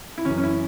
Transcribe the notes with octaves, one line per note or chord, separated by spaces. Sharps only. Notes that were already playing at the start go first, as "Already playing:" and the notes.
E4
F#2 E3 C#4
C#4
E4